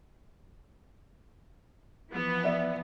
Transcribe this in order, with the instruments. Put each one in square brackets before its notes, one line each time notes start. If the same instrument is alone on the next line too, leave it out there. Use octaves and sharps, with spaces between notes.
[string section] E3 F3 B3
[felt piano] D5 E5